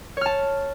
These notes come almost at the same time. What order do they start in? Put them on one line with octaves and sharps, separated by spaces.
C#5 F6 A5